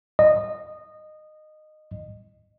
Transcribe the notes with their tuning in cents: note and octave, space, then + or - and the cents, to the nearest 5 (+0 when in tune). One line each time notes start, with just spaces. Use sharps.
D#5 -15